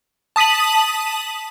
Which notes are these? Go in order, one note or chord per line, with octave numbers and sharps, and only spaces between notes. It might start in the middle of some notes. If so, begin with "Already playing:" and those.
A5 D#6 B6 D#7 F#7